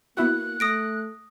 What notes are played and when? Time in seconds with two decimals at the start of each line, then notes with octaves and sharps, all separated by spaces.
0.17 A#3 B3 E4 F#4 F#6
0.60 A3 D#6 A#6 D7